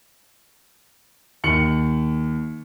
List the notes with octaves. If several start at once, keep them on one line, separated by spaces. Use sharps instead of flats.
D#2 C#7 F#7